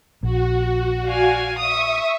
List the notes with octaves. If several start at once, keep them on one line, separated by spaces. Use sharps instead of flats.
A#1 F#4
D5 F5 G#5
E5 C#6 D#6